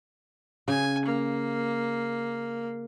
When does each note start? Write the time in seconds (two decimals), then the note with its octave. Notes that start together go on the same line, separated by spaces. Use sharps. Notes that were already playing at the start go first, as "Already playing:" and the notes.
0.68 C#3 G#5
1.05 A#3